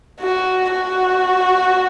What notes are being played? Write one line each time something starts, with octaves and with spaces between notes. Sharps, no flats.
F#4
F#4